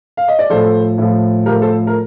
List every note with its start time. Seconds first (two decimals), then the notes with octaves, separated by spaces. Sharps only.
0.17 F5
0.28 D#5
0.39 D5
0.50 A2 F3 A4 C5
0.98 A2 F3
1.46 F3 G4 A#4
1.49 A2
1.62 A4 C5
1.87 A#4